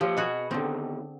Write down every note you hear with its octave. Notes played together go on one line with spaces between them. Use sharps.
F3 G4 C#5
B2 F#4 G#4 D#5 B5
D3 D#3 B3 C4